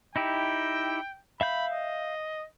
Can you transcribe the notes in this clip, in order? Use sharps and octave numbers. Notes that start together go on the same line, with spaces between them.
D#4 E4 G4 G5
E5 F5 B5 G6
D#5